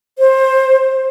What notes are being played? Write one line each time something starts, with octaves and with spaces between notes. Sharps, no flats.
C5